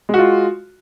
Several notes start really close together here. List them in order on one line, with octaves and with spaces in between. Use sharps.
G#3 F#4 F4